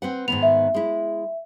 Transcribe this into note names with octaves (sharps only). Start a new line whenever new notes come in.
C4 B4 F#5
G#2 D#3 B3 F7
E5
G#3 E4